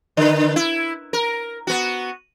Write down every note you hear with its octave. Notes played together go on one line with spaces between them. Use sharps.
D3 B4
E4
A#4
B3 F#4